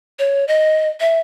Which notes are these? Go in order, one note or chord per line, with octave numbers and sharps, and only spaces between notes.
C#5
D#5
E5